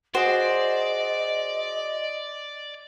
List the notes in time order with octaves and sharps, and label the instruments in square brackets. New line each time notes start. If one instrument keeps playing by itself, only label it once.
[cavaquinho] F#4 G#4 [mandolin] C5 [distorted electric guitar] D5 [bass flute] D#5